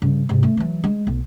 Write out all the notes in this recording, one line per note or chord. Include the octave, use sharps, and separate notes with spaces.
G2 C#3
G#2 C3
A3
E3 F#3
G#3
B1